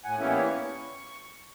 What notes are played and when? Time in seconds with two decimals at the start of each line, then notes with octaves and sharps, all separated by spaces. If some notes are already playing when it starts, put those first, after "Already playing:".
0.05 A2 F#5 G#5
0.20 E3 G3 A#3 B3 C#4 E4
0.45 C#6